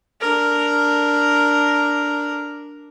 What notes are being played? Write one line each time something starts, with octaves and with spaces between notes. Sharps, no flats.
D4 A#4